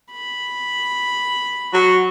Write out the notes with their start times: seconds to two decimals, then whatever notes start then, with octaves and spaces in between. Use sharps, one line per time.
0.12 B5
1.74 F#3 F#4